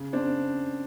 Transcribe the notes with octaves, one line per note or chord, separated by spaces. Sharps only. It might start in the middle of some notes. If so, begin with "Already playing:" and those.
Already playing: C#3
C4 D4